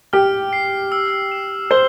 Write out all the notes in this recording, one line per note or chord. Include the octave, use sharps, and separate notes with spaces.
G4 F6
C7
E6
E7
C5 G7